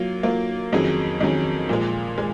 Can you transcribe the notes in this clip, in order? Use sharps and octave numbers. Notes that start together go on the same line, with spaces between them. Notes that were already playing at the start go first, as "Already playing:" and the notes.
Already playing: F#3 A#3 F4
F#3 A#3 F4
F2 D#3 F#3 C#4 G#4
F2 D#3 F#3 C#4 G#4
A#2 F3 G#3
G#3